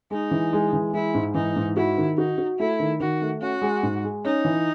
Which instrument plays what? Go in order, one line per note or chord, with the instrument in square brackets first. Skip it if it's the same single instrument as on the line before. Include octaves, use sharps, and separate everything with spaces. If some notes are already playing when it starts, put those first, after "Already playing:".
[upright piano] G#3 [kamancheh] D#4
[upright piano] E3
G#3
E3
[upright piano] G#3 [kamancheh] E4
[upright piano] G#2
[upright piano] E3 [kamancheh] D#4
[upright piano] G#2
[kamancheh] E4 [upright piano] F#4
[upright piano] D#3
[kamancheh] D#4 [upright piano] F#4
[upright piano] F#4
[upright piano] A3 [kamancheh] E4
[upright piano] D#3
[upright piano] D#3 [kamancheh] F#4
[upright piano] A3
[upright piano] C#4 [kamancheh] F#4
[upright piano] G#3
G#2
G#3
[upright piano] C#4 [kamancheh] D#4
[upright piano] E3